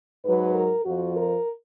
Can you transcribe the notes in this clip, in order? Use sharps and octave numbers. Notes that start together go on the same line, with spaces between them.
G#2 F#3 B4
A#4
F2 F3 F#4
A#4